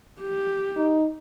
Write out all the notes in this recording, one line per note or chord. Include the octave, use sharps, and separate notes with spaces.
G4
D#4